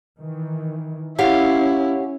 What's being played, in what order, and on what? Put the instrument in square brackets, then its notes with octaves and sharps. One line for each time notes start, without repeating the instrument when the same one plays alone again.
[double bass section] D#3 E3
[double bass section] C#4 [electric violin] E4 [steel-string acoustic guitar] G4 C#5 F5 [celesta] F#5